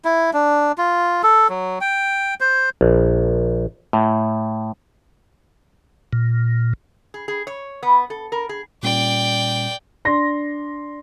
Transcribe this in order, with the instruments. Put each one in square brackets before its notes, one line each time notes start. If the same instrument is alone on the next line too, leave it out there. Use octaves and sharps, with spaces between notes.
[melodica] E4
D4
F4
A4
F#3
G5
C5
[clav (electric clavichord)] A#1
A2
[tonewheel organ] A#2
[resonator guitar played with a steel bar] G#4
G#4
C#5
B3
A4
A#4
G#4
[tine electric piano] A#2 G3 C#4 [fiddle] D5 G5
[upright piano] D4 C6 A#6